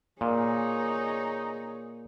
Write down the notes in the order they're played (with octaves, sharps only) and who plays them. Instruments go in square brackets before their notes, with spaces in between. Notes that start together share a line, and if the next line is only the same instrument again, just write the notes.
[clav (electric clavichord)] A#2 [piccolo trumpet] D#4 [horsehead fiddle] G#4 C#5